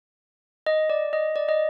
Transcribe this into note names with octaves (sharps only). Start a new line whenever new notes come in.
D#5
D5
D#5
D5
D#5